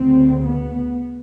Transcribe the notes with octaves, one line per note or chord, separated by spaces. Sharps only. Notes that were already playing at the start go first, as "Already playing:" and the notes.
Already playing: D2 C#3 C4
B3